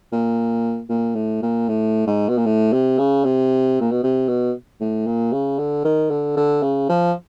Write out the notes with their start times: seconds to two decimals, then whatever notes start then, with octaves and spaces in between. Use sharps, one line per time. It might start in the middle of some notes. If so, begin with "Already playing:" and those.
0.12 A#2
0.89 A#2
1.15 A2
1.42 A#2
1.68 A2
2.07 G#2
2.29 B2
2.37 A#2
2.46 A2
2.73 C3
2.98 C#3
3.24 C3
3.80 A#2
3.91 B2
4.03 C3
4.28 B2
4.81 A2
5.06 A#2
5.32 C#3
5.59 D3
5.84 D#3
6.10 D3
6.37 D3
6.62 C#3
6.89 F3